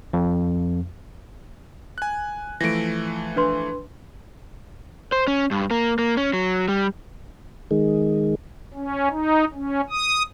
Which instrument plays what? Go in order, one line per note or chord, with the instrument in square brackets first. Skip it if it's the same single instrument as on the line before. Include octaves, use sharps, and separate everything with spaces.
[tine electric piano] F2
[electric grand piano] G#5 F#6
[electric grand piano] E3 F3 A3 [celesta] A#6 D7
[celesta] D4 B4 C6
[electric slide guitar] C5
C#4
G2
A#3
A#3
C#4
F#3
G3
[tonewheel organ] D#3 G#3
[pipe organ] C#4
D#4
C#4
D#6